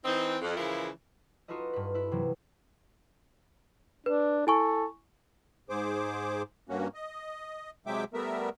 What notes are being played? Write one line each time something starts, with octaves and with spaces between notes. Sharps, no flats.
E3 C4 D#4
F2
C#3 E3 F3 G#3 E4 A#4
D#4 F4 F#4 A4 B4 D#5
G2 B4
E4 B4
C3 E3 F#3 A#3
D4 B4
E4 A4 G#5 C#6
G#2 G#4 C5 D6
G2 A#3 C#4 F#4
D#5
C3 F#3 G#3 E5 G5 D6
G3 A3 B3 A#4 E5